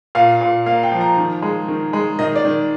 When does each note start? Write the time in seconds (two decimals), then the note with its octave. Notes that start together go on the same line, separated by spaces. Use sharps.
0.15 A#2 F5
0.41 A#2
0.66 A#3 F5
0.83 G5
0.92 F3
1.01 A#5
1.17 D#3
1.42 G#3
1.68 D#3
1.93 G#3
2.19 D#3 D#5
2.36 D5
2.45 D#3